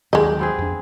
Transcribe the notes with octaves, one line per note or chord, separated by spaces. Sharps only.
D#2 D#3 F#3 G#3 G4 D#5
B3 C4 G#4
F2 D4